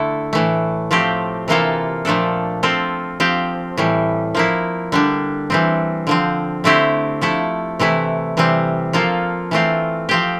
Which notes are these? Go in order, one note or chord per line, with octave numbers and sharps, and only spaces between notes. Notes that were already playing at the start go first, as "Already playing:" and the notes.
Already playing: D3 A3 E4 A4
A2 E3 A3
F3 A3 C4 G4
C3 E3 A#3 F4 A4
A#2 F3 A3 D4 A4
F3 C4 F4 A4
F3 C4 G4
A2 E3 G3
F3 A#3 E4
D3 G3 D4
E3 G3 C4
D3 F3 C4
D3 A3 C4 E4 G4
F3 A3 E4 A4
C3 E3 A3 E4
C3 E3 G3 C4
F3 A#3 F4 A4
E3 A3 C4 F4
F3 C4 G4